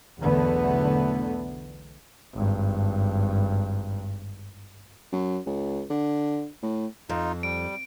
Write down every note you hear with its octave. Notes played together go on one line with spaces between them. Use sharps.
B1 E2 D3 A3 B3
G#1 G2
F#2
C#2
D3
A2
F2 D#4 F4
G3 D7